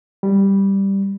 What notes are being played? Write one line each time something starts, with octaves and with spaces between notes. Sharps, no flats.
G3